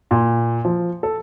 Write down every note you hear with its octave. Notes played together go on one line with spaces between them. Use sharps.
A#2
F3
A4